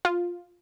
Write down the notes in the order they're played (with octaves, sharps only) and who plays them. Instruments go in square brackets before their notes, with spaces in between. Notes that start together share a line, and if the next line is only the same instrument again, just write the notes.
[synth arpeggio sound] F4